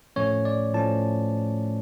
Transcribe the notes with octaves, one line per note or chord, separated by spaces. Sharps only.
A2 F3 A3 C#4 C#5
D5
A2 F3 A3 C#4 A5